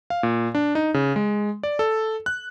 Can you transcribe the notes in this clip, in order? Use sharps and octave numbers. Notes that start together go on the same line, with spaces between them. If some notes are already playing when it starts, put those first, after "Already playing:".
F5
A#2
D4
D#4
C#3
G#3
D5
A4
F#6